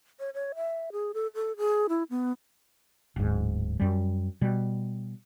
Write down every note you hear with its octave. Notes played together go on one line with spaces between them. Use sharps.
C#5
C#5
E5
G#4
A4
A4
G#4
E4
B3
D1 G#2
F#2 G3
B2 G3